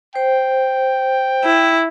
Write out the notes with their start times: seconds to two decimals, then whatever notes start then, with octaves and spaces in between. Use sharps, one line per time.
0.15 C5 G5
1.44 E4